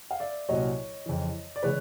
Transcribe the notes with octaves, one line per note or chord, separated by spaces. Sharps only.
F5
D5 E5
C2 A#2 F#3 C#5 D#5
F2 C#3 E3
D5
C#3 E3 G#3 B4 C#5